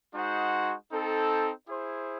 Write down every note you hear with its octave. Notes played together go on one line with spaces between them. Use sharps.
G#3 D#4 F#4 C5 F#5
C4 D#4 A4
E4 G#4 C5